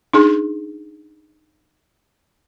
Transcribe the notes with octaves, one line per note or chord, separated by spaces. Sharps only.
D4 D#4 G#4